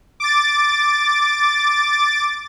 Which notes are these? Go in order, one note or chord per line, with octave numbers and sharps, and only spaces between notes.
D6 A6